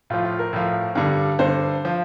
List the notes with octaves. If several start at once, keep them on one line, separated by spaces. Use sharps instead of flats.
A2 F3 F4
F4
A#4
A2 F3
G2 D3 G3
G2 D3 G3 C5
F3